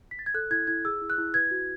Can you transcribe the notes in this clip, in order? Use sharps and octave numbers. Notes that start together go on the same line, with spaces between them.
B6
A6
G#6
A4 F#6
E4 G#6
E4 G#6
G#4 E6
E4
F#6
E4
B4 G#6
F#4